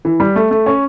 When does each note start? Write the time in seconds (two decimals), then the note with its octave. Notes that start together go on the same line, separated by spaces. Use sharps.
0.05 E3
0.20 G3
0.36 A3
0.51 A3
0.66 C#4